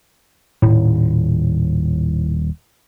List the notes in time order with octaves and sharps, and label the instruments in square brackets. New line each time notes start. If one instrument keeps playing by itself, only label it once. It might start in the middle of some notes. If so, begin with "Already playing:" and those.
[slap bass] D#1 [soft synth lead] A2